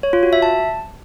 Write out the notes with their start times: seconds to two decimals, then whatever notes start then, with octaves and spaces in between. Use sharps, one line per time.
0.03 C#5
0.13 F4
0.23 F#4
0.33 E5
0.42 A5